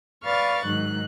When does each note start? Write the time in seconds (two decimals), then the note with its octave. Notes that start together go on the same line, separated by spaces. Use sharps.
0.24 B4 D5 F5 C#6 F6 A6
0.64 G#2 D#3 F#3 F#6